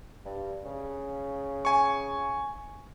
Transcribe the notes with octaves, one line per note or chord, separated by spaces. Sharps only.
G2
C#3
G#5 C#6